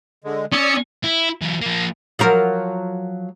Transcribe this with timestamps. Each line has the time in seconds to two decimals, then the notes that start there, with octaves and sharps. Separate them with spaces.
0.24 D3 G#3
0.52 C#4 D5 D#6 E6
1.04 E4
1.42 E3 F#3
1.62 F3 A#3
2.19 F3 F#3 A#4